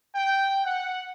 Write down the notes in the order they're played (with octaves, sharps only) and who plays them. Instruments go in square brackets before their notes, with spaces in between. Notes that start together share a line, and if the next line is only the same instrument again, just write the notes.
[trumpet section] G5
F#5